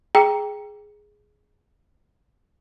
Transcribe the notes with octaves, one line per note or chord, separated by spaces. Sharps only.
G#4 G5 A#5 C#7